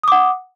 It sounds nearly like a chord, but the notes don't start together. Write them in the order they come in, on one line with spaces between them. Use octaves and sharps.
D#6 D6 F#5